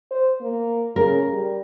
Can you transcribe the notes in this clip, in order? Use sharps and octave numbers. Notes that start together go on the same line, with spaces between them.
C5
A#3
C#3 A#4
G3